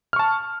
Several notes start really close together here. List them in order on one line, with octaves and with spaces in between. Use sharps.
F6 C#6 A5